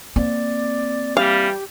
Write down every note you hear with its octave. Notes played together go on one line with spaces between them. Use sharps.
A#3 C4 D5
E3 G3 G4 F5